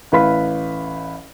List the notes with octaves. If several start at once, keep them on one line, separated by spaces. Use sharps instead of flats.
A1 E4 B4 F5 B5 B6